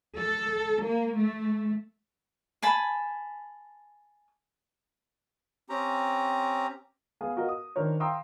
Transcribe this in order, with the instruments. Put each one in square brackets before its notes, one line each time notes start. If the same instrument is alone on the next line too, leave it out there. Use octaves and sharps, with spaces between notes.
[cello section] A4
A#3
A3
[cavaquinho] G#5 A5 B5
[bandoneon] C4 C#4 G4 A#5
[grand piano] B3 G#4 F5 D#6
F#4 A#4 D#5 F5
D#6
D#3 D4 A#4 C5 C#5
F5 G5 A#5 C6 D#6 E6